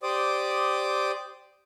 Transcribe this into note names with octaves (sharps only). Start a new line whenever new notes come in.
G4 C5 D5 D6 D#6